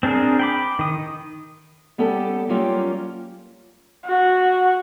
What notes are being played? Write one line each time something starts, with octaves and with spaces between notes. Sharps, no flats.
C4 D4 G#4 A#4
G5 B5 D6
D#3 D#6
G3 B3 C#4 G4 A4
F#3 G3 A#3 C#4 F4 G4
F#4